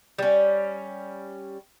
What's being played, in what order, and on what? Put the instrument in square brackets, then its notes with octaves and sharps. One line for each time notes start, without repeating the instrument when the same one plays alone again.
[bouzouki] G3 C#4